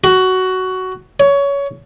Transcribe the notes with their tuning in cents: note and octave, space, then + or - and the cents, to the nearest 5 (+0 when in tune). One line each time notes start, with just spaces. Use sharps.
F#4 +10
C#5 +20